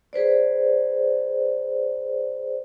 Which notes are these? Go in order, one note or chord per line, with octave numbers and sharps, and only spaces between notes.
G#4 B4 C5 D5